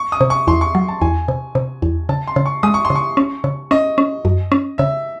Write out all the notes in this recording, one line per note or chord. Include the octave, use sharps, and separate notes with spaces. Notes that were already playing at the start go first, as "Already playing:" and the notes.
Already playing: C#6
D#6
C3
C#6
E2 C6
C#6
F#3
A5
E2 G#5
C3
C3
E2
C#3 A5
C6
C#3
C#6
G#3 D#6
C#6
C6
C#3
C#6
C#4
C#3
C#4 D#5
C#4
F#2
C#4
C#3 E5